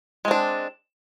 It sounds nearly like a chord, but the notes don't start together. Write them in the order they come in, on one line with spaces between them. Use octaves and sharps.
G#3 C4 D4